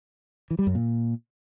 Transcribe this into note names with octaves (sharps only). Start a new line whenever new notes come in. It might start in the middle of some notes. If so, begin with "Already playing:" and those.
E3
G3
F#2
A#2